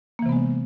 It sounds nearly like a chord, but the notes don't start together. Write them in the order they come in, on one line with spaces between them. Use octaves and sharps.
A#3 E3 C3 B3 G#3